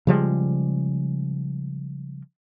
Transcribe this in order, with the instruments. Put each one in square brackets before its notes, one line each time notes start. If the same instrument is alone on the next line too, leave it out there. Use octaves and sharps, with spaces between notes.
[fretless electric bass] C#3 F3 G3 G#3